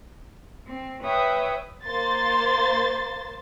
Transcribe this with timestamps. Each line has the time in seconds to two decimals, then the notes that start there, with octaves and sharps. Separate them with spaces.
0.65 C4
1.03 B4 C#5 E5 G5 D#6
1.84 A#3 C5 C6 A6